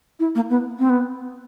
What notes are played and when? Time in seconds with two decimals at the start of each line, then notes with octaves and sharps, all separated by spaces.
0.20 E4
0.35 A#3
0.50 B3
0.79 C4
0.89 B3